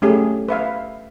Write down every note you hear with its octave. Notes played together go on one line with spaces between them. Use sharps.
A3 C#4 G4 G#4
B4 E5 F5